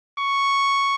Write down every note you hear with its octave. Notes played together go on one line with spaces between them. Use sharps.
C#6